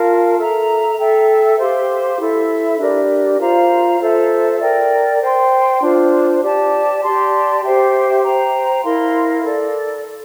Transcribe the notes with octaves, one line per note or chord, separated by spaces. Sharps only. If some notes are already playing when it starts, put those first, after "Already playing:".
Already playing: F4 A#4 F5 A5
A4 E5 A#5
A4 E5 G5
G4 C5 F5 C6
E4 A4 E5
D4 G4 A#4 D5
F4 C5 F5 A#5
F4 A4 C5 E5
A#4 D5 G5
C5 G5 C6
D4 F4 C5
G4 D5 A5
G4 D5 A5 C6
G4 C5 E5 G5
C5 G5 A#5
E4 A#4 F5 C6
A4 D5